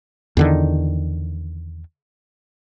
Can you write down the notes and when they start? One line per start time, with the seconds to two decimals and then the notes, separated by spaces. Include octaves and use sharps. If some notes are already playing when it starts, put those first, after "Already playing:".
0.37 E2 D3 D#3